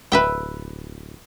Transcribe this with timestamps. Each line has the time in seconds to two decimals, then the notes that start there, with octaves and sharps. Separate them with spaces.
0.12 D1 B4 E5 G5